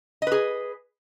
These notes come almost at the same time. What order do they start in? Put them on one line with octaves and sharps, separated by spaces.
D#5 B4 G#4